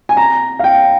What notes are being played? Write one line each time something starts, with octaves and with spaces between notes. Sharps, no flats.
G#5
A#5
F5
G5